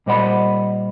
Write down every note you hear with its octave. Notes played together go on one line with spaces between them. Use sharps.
A#2 G3 C5 D#5 F#5 B5